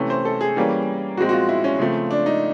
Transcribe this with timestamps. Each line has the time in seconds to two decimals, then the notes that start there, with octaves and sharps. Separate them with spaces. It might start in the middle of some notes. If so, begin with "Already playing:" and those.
Already playing: C3 E3 A3 C#4
0.10 C5
0.25 A4
0.41 G#4
0.56 E3 G3 A#3 C#4
1.17 A#2 F3 G#3 C4 F#4
1.29 F#4
1.33 F4
1.49 E4
1.64 C#4
1.79 C#3 F3 A3 C4
2.11 D4
2.26 D#4